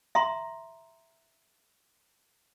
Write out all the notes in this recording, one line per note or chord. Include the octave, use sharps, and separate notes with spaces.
E5 A#5 C6